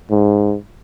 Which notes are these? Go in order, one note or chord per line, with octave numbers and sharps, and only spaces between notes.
G#2